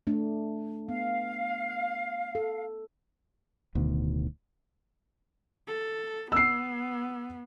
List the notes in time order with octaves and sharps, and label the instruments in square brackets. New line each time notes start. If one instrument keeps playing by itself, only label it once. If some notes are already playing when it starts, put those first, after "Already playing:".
[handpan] A3 D4
[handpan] B3 [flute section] F5
[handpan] A4
[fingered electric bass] D1 D2 B2 D#3
[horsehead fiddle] A4
[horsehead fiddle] B3 [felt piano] E6 C7